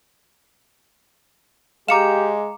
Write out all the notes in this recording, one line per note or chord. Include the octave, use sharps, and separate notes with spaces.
G#3 G4 F5 A#5 D6 C#7 E7